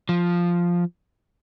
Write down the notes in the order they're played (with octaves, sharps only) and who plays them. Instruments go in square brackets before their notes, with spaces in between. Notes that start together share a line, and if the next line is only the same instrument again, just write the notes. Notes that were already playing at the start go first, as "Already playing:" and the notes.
[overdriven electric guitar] F3